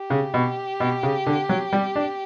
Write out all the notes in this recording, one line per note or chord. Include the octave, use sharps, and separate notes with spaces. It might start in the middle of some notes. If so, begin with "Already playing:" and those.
Already playing: G4
C#3
B2
B2
C#3
D3
F#3
G3
D4